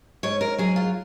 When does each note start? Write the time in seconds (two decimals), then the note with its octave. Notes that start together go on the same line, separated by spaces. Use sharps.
0.23 G#2 C#5
0.41 A#4
0.58 F#3 G#4
0.76 F4